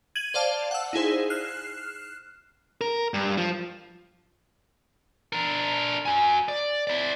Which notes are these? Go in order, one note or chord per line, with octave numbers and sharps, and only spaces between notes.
G#6 D#7 F#7
C5 D5 F5 A5
F#5 E6
D#4 E4 G#4 C5
F6 F#6 C7 E7
A#4
G2
F3
D4 A#4
F#4 G#5
D5
E4 D5